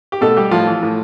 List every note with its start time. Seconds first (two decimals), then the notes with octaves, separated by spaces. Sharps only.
0.12 G4
0.21 B2 A3 A4
0.37 G3 G4
0.51 A2 F3 F4
0.67 E3
0.82 A2